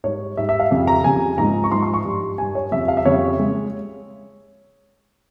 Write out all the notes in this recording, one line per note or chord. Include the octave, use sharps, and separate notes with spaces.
G#2 G3 C#5
G#2 G3 E5
E5
F5
F2 C#3 G3
A#5
F2 C#3 G3 G#5
G#2 F3 G#3 A#5
C#6
G#2 F3 G#3 C6
C6
C#6
G2 G3
G2 G3 G#5
C#5
F2 C#3 G3 E5
F5
E5
F2 C#3 G3 C#5
G#3